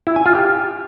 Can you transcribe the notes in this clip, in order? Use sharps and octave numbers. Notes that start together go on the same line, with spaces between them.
E4
G#5
F4
G4